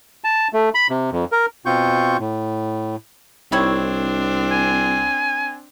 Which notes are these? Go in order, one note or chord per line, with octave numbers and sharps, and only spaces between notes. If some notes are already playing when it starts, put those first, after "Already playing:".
A5
A3
B5
C3
F2
A#4
B2 C4 F4 C#6 G6
A2
C2 D#3 C4 D4 E4 C#5
G#5